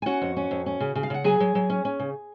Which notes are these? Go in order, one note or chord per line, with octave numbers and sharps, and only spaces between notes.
G#5
C#4 F#4 F#5
F2
C#4
F2
C#4
C#3
C#3
F5
C#3 F#5
F#3 G#4 G#5
F#3
F#3
C#4
C#4
C#3